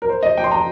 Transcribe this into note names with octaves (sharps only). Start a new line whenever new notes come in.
A#4
C5
D#5
G5
C6
A#5